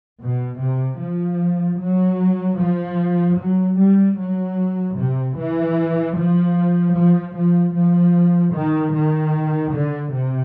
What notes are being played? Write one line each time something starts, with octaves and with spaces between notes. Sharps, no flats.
B2
C3
F3
F#3
F3
F#3
G3
F#3
C3
E3
F3
F3
F3
F3
D#3
D#3
D3
C3